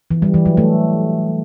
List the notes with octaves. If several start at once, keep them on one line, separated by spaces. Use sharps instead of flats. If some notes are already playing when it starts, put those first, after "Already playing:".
E3
G3
E3
F#3
A3